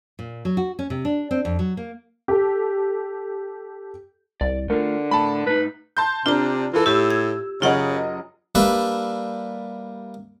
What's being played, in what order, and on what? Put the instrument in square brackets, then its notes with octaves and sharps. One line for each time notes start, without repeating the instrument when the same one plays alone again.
[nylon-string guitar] A#2
F#3
F#4
C#4
C3
D4
C4
F2
F#3
A#3
[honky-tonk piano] G4 A4
[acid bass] C2 [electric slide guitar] D5
[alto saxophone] D3 [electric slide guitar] A3 F4 [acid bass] A#4
[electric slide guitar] A2 [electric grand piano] A5 B5
[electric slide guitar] A2 D#4 [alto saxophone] B4
[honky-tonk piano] A5 C6 G6
[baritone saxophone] C3 [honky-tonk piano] D4 [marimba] F4 A#5
[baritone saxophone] E3 [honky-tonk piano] F4 A4
[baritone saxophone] A2 [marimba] G4 [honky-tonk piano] E6
[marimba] G#6
[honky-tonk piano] F#1 D#5 [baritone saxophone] C#3 [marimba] F4 F#5
[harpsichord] G3 A#3 D4 B4 E5